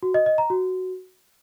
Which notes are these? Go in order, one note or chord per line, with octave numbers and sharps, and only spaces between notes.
F#4
D#5
D#5
A#5
F#4